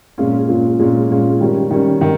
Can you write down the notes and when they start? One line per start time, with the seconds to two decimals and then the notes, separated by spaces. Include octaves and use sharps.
0.18 A#2 G#3 C#4 F4
0.48 A#2 G#3 C#4 F4
0.79 A#2 G#3 C#4 F4
1.09 A#2 G#3 C#4 F4
1.41 D#3 G3 C#4
1.71 D#3 G3 C#4
2.01 D#3